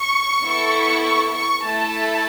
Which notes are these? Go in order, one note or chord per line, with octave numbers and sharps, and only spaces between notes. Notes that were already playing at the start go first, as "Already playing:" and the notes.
Already playing: C#6
B3 E4 A4
C#6
C#6
A3 E4 A4 A5